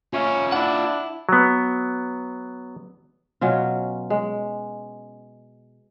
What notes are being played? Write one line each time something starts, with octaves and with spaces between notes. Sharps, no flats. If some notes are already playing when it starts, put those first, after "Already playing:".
C#4 F4 E5
D4 E4 F#5
F#3 B3
B2 F#3 C#4 F4
G#3